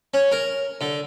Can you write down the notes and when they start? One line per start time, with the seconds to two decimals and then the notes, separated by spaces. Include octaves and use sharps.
0.14 C#4
0.32 A#4
0.81 D3